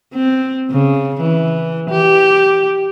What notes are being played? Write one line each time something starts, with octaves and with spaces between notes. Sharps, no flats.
C4
C#3
E3
G4